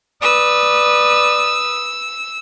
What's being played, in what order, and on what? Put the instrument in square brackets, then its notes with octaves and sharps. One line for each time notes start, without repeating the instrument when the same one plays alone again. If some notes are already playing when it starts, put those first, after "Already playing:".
[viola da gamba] B4 [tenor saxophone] D5 [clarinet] D#6 [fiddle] E6